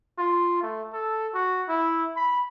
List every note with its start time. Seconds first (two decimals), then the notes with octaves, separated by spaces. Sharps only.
0.18 F4
0.63 A3
0.93 A4
1.34 F#4
1.69 E4
2.16 B5